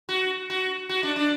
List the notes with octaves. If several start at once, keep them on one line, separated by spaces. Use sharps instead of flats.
F#4
F#4
F#4
D4
D4